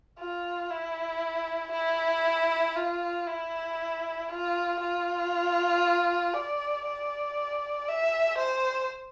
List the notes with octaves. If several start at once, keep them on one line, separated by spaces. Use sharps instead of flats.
F4
E4
E4
F4
E4
F4
F4
D5
D5
E5
C5